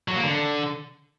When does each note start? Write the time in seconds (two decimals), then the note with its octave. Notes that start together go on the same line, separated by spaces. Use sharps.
0.08 F#3
0.16 A#3
0.24 D3